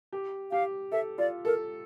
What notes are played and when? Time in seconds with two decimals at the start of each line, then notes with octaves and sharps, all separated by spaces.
0.13 G4
0.51 G4 F5
0.92 A4 E5
1.18 F4 D5
1.45 A4 A#4